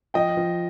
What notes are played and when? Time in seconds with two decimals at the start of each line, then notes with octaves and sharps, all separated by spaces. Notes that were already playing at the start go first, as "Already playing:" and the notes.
0.14 F3 D#5 G5
0.37 F3